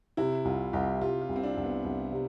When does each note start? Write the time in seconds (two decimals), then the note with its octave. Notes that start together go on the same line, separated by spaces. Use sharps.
0.17 C3 E4
0.45 C2 F4
0.73 C2 G4
1.01 C3 F4
1.22 F4
1.29 C2
1.36 C4
1.43 D4
1.57 C2
1.64 B3
1.84 C2
2.12 C3